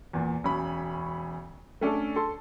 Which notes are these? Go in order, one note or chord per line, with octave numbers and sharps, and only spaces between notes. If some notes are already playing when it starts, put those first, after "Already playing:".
E2 A#2
E1 C#4 B5
A3 C#4 D4 A4
A4 C6